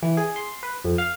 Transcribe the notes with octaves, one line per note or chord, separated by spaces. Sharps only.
E3
G#4
C6
B4
F2
F5